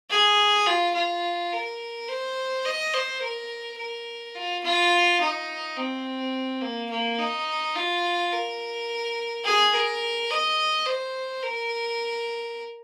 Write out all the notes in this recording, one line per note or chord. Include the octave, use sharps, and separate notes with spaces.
G#4
F4
F4
A#4
C5
D#5
C5
A#4
A#4
F4
F4
D#4
C4
A#3
A#3
D#4
F4
A#4
G#4
A#4
D#5
C5
A#4